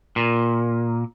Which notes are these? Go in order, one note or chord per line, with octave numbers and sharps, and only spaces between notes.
A#2